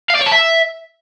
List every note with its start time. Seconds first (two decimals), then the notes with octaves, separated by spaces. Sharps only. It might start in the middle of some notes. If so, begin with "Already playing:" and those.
0.10 F5
0.15 D5
0.21 C#5
0.27 A5
0.32 E5